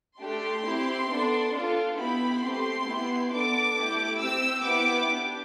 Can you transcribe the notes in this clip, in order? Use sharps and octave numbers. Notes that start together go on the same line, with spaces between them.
A3 D4 G4 C6
C4 E4 G4
B3 D4 A4
D4 F4 A4
B3 E4 G4 B5
A3 C4 G4 C6
B3 E4 G4
B3 D4 A4 D6
A3 E4 G4
C4 G4 E6
B3 E4 G4 D6
D4 G4